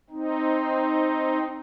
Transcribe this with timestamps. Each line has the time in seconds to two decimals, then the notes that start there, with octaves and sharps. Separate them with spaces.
0.10 C4 D#4